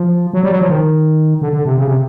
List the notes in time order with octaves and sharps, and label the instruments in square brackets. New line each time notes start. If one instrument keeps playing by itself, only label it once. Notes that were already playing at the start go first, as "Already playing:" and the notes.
Already playing: [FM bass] F3
F#3
G3
F#3
F3
D#3
D3
D3
C3
C#3
C3